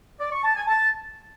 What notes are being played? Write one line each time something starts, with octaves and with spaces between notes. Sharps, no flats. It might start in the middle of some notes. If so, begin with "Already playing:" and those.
D5
C#6
A5
G#5
A5